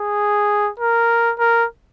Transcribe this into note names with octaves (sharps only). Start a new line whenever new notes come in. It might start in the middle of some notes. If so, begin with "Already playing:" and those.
Already playing: G#4
A#4
A#4